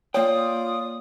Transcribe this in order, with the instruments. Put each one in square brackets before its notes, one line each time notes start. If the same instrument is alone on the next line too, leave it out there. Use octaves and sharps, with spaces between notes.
[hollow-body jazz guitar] A#3 G5 [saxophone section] F4 D5 [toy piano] C#5 [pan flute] D#6